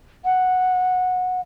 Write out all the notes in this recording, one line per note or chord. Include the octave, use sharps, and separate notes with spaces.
F#5